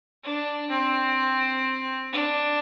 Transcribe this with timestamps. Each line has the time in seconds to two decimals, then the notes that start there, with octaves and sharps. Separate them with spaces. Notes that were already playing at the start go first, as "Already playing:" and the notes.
0.23 D4
0.70 C4
2.12 D4